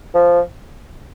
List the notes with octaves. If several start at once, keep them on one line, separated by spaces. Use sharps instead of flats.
F3